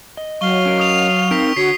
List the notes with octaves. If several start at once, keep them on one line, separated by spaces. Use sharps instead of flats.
D#5
F#3 F5 C#6 G7
C#4 A#4 D#5
C#6 D#6 F7
C4 D#4 A#4 B6 D7
D3 F#4 C#5 C7